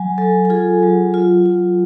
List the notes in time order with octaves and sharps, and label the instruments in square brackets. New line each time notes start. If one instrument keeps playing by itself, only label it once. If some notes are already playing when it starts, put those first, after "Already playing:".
Already playing: [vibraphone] F#3 G#5
F#3 A4
A4
F4 G#4
F#3
F4
F4